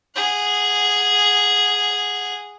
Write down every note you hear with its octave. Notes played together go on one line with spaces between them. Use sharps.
G#4 F#5